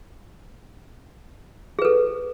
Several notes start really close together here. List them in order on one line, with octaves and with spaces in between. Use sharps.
G#4 B4 A4